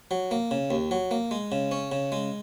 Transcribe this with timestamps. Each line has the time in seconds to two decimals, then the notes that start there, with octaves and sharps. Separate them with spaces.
0.11 F#3
0.31 A#3
0.51 C#3
0.71 D#2
0.91 F#3
1.11 A#3
1.31 G#3
1.52 C#3
1.72 C#4
1.92 C#3
2.12 G#3